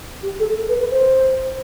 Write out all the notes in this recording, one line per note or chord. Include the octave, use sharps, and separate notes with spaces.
G4
A4
A4
B4
B4
C5